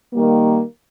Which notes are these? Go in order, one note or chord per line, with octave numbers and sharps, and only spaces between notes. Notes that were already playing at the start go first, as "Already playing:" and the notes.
D#3 G3 A#3